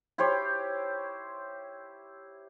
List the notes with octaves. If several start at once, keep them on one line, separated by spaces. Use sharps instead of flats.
E4 G4 C5 C#5